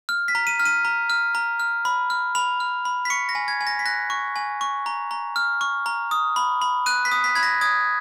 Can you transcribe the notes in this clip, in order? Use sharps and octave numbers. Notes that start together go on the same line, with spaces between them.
F6
B6
A#5
D#7
F6
D#7
A#5
F6
A#5
F6
B5
F6
B5 F7
F6
B5
B6
C#6 C#7
A#6
G#5
G#6
G#5
A#6
B6
F#6 A#6
C#6
G#5
C#6
A#5
A#5
F6
C#6
A#5
D#6
B5
B5
F#6 D#7
B6
D#6
B6
B5 G#6
A#6
D#6 G#6